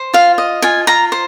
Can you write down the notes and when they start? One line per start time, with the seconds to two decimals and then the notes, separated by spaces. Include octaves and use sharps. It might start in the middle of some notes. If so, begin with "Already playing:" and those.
Already playing: C5
0.14 F4 F5
0.38 D#5
0.62 F4 G#5
0.87 F4 A#5
1.12 C5